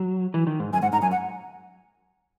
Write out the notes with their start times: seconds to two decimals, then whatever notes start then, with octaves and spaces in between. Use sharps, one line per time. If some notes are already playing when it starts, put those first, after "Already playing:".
Already playing: F#3
0.34 E3
0.47 D#3
0.60 G#2
0.73 F#2 G#5
0.82 G#2 F#5
0.93 G#2 A#5
1.02 F#2 G#5
1.12 F#5